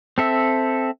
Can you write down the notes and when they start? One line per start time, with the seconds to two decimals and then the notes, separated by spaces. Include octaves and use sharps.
0.18 C4 A4 E5